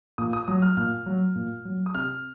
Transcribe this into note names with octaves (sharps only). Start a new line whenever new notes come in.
A#2 D#6
D#6
F#3 D#6
F6
A#2 F6
F#3
A#2
F#3
D#6
C3 F6